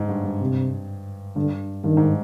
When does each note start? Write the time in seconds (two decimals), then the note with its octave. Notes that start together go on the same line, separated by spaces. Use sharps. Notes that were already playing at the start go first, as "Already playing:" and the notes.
Already playing: G#2 D3
0.09 G2
0.24 G2
0.41 C3
1.36 G2 D3
1.84 G2 D#3
1.97 G#2